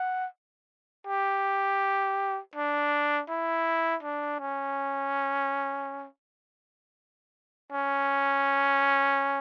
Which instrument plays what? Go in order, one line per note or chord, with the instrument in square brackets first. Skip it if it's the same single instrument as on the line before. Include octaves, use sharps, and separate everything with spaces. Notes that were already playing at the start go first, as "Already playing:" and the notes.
Already playing: [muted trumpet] F#5
G4
D4
E4
D4
C#4
C#4